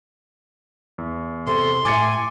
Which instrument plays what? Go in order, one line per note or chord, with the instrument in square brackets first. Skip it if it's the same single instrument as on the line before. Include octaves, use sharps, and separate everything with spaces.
[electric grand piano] E2
[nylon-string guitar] C3 [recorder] A4 [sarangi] C6
[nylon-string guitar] A2 E5 [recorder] G#5 [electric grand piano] D6 A6 C#7